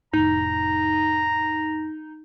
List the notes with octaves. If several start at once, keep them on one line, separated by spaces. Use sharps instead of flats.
F1 A2 D#4 A#5